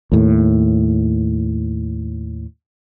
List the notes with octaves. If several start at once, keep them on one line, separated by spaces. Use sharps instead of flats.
D#2 A2